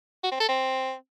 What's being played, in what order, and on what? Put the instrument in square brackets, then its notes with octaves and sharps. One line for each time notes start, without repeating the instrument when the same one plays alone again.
[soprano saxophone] F#4
C4
A4
C4